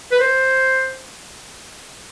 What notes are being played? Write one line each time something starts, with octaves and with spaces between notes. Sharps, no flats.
B4
C5